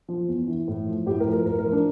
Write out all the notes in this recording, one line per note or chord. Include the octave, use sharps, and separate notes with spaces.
F3
E2
E3
A2
F3
A2 G4
A#4
F3
A#4
A2 A#4
A#4
F3
D4